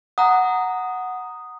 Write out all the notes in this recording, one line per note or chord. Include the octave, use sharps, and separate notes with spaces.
F#5 A#5 D#6